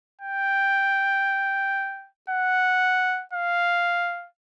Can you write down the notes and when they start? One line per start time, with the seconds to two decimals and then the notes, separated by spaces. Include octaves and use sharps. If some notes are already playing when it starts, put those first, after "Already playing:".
0.22 G5
2.30 F#5
3.33 F5